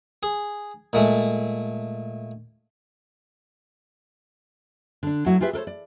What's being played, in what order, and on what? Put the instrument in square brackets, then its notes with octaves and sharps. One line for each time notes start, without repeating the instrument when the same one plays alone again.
[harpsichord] G#4
A#2 G#3 A3
[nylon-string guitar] D3 D4
F#3 A3 E4 F#4
F4 G4 G#4 B4 E5
A4 A#4 C5 C#5
D5